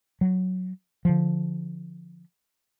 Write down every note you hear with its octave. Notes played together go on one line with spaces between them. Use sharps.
F#3
D3 F3